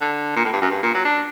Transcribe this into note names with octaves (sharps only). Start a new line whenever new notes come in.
D3
A#2
A2
G2
F#2
G2
A#2
F#3
D4